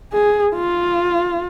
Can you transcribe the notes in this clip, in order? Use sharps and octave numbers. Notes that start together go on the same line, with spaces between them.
G#4
F4